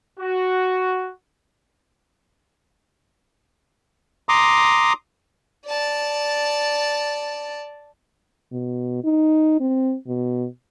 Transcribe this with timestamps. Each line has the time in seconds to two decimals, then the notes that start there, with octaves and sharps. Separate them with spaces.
0.20 F#4
4.29 A#5 C6 D6 D#6
5.66 D5 A5
8.52 B2
9.04 D#4
9.60 C4
10.08 B2